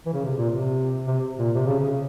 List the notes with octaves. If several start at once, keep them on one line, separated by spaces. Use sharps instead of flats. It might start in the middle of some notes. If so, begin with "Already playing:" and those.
E3
C#3
C3
A#2
C3
C3
A#2
C3
C#3
C#3
C#3